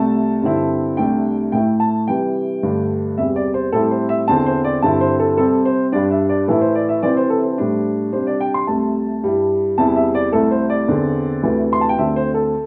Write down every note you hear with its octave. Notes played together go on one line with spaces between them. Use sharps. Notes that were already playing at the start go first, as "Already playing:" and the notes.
Already playing: C2 C3 A3 A5
G2 D3 C4 E4
C2 C3 A3 D4 G5
A2 A3 E4 G5
A5
C3 E3 G3 G5
G2 D3 A3 D4
E2 C3 G3 E5
D5
C5
A2 G3 C4 E4 A4
C5
E5
E2 D3 C4 E4 A5
C5
D5
G2 D3 C4 E4 A5
C5
A4
C3 G3 C4 A4
C5
G2 G3 D4 D5
E5
D5
A2 E3 A3 E4 A4
C5
D5
E5
C3 E3 C4 E4 D5
C5
A4
C5
A2 G3 D4
C3 G3 D4 C5
D5
G5
C6
C2 C3 A3 A5
G2 G3 E4
E2 C3 G3 E4 A5
E5
D5
C2 C3 A3 E4 A4
C5
D5
E2 D3 C4
D2 C3 E3
C6
A5
G5
D2 D3 C4 E5
C5
A4